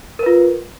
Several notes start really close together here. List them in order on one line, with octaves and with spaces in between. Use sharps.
A#4 B4 F4